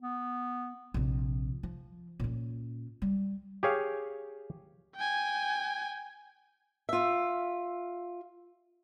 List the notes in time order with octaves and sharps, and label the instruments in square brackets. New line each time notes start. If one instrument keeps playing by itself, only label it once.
[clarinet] B3
[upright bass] A#1 C3
F3
A#2 C#4
G3
[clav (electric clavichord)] G4 G#4 C#5 F5
[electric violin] G5 G#5
[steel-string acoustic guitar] F4 E5